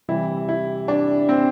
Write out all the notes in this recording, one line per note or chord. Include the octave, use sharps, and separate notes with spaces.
C3 E3 G3 E4
E4
D4
C4